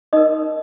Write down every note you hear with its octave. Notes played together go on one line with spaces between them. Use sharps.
D#4 A#4 D#5 D#6